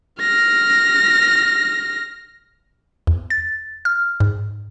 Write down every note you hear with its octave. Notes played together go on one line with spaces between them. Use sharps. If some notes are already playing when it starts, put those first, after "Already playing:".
F6 A#6
E2
A6
F6
G#2